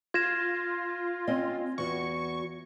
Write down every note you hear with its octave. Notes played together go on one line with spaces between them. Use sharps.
F4 G#6 A#6 E7
C4 C#4 D#5
E2 F#4 C#6